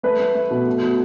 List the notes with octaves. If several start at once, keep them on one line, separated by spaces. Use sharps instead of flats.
A3 B4
A3
A3
B2
A3
B2